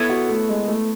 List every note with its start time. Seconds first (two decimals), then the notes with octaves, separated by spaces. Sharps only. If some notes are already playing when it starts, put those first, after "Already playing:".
Already playing: B3 E4 A4 C#5
0.09 F#4
0.29 A3
0.49 G#3
0.68 A3